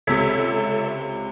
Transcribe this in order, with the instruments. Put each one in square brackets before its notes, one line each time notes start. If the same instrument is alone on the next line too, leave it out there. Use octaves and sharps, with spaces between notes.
[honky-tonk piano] C#2 C3 [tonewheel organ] A4 C#5 E5